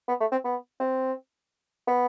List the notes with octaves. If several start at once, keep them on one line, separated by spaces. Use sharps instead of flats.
B3
A3
C4
B3
C4
B3